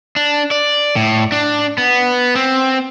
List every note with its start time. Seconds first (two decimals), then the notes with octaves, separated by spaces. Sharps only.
0.16 D4
0.51 D5
0.96 A2
1.32 D4
1.78 B3
2.35 C4